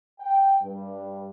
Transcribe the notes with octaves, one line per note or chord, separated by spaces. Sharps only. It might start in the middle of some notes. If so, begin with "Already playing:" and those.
G5
G2